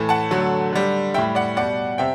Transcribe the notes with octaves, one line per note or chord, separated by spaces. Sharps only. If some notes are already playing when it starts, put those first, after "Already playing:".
Already playing: A2 E3 A3
F#5 A5
D3 F#3 A3
D3 G3
A2 G3 E5 G5
D5 F#5
B2 G3 D5 F#5
C3 E5 G5